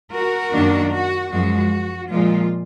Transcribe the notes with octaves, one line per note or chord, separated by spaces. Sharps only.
F#4 A#4
F#2 D#3 A#3 D4
F#4
F#2 F3 G#3 F#4
A#2 F3 G#3 F4